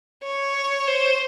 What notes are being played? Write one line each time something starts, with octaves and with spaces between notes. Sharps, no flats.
C#5
C5